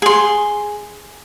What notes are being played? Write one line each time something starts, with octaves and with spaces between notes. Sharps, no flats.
G#4 C6